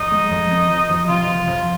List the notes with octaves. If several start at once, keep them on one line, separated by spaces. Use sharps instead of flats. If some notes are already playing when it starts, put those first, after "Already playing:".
Already playing: F2 D#4
G#3
F2
F2
F3
F3
C3 F4
F3
F2